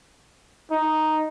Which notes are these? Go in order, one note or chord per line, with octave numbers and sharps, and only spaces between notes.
D#4